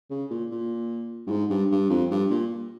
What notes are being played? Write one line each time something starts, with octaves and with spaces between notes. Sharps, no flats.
C#3
A#2
A#2
G2
G#2
G2
G2
F2
G2
A#2